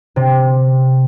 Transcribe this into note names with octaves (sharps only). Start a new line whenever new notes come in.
C3